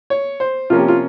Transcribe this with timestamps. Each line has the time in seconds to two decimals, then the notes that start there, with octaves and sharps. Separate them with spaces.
0.10 C#5
0.40 C5
0.70 C3 F3 A#3 C#4 F4
0.79 G4
0.88 F4